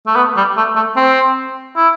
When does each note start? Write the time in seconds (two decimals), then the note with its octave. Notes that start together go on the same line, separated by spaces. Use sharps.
0.07 A3
0.16 B3
0.37 G3
0.57 A3
0.76 A3
0.96 C4
1.77 E4